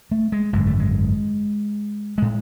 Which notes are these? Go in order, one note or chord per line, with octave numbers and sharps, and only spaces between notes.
A3
G#3
G#1 F#2 D3 G#3
A3
G#3
A2 G#3